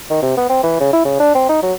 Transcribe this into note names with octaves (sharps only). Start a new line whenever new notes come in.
D#3
C3
B3
C4
E3
C#3
E4
C#3
D4
C4
D#4
F#3